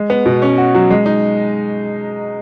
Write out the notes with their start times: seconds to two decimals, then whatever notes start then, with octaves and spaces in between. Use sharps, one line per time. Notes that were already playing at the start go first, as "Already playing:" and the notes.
Already playing: G#3
0.10 B3
0.26 B2
0.42 C#4
0.58 F#4
0.75 F#3
0.90 G#3
1.06 D#4